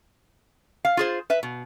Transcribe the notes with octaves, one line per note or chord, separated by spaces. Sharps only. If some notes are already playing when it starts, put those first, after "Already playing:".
F5
F4 G#4 C5
B4 E5
B2